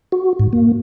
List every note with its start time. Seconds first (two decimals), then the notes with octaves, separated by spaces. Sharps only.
0.12 F#4
0.39 G#2
0.53 A#3